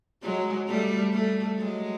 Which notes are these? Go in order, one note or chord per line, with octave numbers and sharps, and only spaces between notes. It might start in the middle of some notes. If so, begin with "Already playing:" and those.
F#3 G#3
G3 A3
G3 A3
F#3 G#3